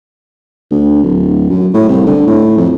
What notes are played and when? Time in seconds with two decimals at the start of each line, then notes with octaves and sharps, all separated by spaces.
0.71 D2
1.04 D1
1.49 F#2
1.74 A2
1.89 C2
2.06 D3
2.27 A2
2.57 F2